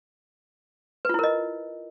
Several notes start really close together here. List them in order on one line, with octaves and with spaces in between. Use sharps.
B4 F4 E4 A#4 D#5